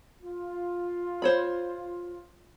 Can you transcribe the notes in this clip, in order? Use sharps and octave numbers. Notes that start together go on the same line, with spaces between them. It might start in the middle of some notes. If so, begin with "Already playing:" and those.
F4
C5 C#5 B5